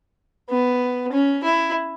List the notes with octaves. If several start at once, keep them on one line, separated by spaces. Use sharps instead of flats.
B3
C#4
E4